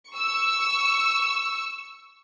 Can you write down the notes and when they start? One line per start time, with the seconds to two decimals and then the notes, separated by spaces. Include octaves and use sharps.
0.11 C#6 E6